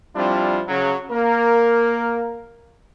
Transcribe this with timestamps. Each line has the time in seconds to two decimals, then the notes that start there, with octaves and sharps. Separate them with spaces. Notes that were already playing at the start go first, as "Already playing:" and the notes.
0.15 F3 G3 C4 D4 E4 F4
0.69 C#3 F#3
1.11 A#3 A#4